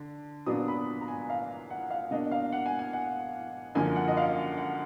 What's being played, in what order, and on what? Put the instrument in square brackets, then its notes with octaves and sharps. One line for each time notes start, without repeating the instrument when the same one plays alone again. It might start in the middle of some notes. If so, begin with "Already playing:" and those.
Already playing: [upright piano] D3
A#2 F#3 B3 D4 D#6
B5
A#5
G#5
F5
F#5
F5
B2 A#3 D4 D#5
F5
F#5
G#5
G#5
F#5
F#2 D3 F3 A#3 G#5
F#5
D#5
F5
F#5